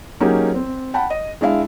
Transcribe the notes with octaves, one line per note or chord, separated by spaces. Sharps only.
F#3 A#3 C#4 D#4 G4 G#4
C4
F#5 G5 A5 B5
D#5
G#3 D4 E4 F5